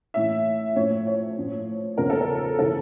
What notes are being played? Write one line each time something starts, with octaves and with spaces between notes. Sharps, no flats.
A2 E3 E5
A2 F3 C#5
C#5
A2 F3
E2 C#3 F3 A#4
A4
A#4
C#3 E3 A4